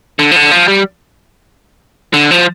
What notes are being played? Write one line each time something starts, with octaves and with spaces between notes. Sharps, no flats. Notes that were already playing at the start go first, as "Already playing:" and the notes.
D3
F3
D3
F3
G3
D3
F3